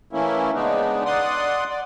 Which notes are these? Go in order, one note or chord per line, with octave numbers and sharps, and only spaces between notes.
E3 A3 A#3 C#4 E4
C#3 G#3 B3 D4 D#4
D5 F#5 C6 D#6
D5